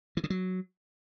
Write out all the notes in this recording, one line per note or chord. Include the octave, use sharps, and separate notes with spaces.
E3
C#3
F#3